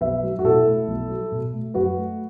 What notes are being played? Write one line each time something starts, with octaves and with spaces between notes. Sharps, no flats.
B1 B4 E5
F#3
F#4
B2 E4 A4
A3
B1
F#3
B2
A3
F#2 F#4 B4
A3